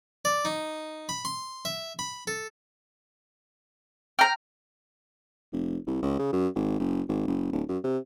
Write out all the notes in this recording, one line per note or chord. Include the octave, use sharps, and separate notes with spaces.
D5
D#4
B5
C6
E5
B5
A4
G5 A#5 F6
F1
C2
C#2
C#3
F#2
G#1
F#1
G#1
F#1
D1
F#2
C3